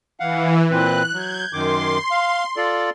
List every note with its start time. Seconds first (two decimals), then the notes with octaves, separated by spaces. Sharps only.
0.20 E3 F5 F#5
0.70 A#2 C4 B4 F#6
1.13 F#3 G6 G#6
1.53 F#2 D#3 C6 D6
2.11 F5
2.57 F4 A4 D5